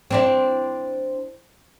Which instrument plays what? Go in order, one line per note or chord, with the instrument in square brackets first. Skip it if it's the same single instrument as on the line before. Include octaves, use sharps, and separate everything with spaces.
[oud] C4 D4 E4